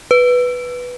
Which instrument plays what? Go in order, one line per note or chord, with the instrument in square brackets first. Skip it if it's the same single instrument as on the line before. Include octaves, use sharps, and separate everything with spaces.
[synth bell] B4